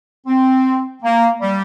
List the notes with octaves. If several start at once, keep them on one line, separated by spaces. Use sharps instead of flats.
C4
A#3
G3